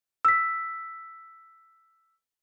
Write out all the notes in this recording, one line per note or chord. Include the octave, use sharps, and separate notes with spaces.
E6 B6